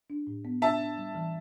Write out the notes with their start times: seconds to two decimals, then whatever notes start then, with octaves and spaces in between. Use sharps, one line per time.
0.10 D4
0.27 A2
0.45 B3
0.62 D4 E5 A5
0.80 D4
0.98 G3
1.15 E3